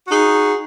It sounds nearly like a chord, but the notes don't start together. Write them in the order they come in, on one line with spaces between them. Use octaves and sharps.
F#4 G#4 D#4